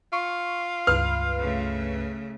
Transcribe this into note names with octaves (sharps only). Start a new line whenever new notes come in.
F4 C#6
C#2 G2 B4 F6
C#3 A3